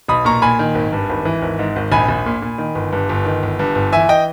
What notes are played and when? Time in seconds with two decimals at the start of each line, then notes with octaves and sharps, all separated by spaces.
0.08 B1 B5 D#6
0.25 A#2 A#5 C#6
0.42 A#2 G#5 B5
0.59 D#3
0.75 G#1
0.92 G2
1.09 G#1
1.25 E3
1.42 G#1
1.59 G#2
1.76 G#1
1.92 A#1 G#5 B5
2.08 A#1
2.26 A#2
2.42 A#2
2.58 D#3
2.75 G1
2.92 G2
3.09 G1
3.25 D#3
3.43 G1
3.59 G2
3.75 G1
3.92 E3 E5 G#5
4.09 D#5 G5